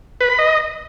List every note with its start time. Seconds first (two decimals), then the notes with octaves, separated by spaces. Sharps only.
0.21 B4
0.30 B5
0.39 D#5